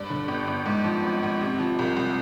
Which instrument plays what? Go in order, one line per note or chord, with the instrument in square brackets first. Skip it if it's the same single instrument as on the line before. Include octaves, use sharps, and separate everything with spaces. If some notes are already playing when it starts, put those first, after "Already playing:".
Already playing: [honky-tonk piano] G2 D5
D3
G1
G1
G#2
F3
G#1
G#1
C3
F3
C2
C2